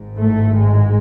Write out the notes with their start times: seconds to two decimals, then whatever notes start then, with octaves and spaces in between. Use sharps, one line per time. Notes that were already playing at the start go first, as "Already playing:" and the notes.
Already playing: G#1 G#2
0.18 A2 A3
0.55 G#2 G#3